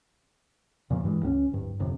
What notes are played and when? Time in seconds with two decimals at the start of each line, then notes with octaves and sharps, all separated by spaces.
0.90 E2 A#2 C#3 F3
1.03 G2 E3 F#3 G#3
1.23 C#2 B3 C#4
1.51 D1 G2
1.80 G1 F2 C3